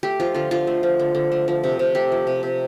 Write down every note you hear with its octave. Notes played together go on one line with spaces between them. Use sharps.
A3 G4
F3 F4
D3 F4
D3 F4
A3
F3
D3
D3
A3
F3
C3
C3
A3 G4
F3
C3
C3